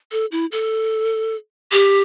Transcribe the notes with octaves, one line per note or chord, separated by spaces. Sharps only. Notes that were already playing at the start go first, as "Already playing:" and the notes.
A4
E4
A4
G4